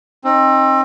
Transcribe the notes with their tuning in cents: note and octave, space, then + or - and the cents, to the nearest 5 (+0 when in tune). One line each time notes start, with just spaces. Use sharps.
C4 +30 D#4 -5